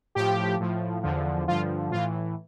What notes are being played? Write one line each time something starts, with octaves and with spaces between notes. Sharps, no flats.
A2 F3 G4
A2 F3
E2 D3 F3
G2 D3 F3 F4
A2 E3 F4